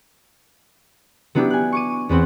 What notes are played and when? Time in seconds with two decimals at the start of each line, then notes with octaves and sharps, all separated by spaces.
1.35 F#3 B3 D4 E4 G4
1.50 G#5 F#6
1.72 C#6 D6 D#7
2.09 E2 B3 C4 F#5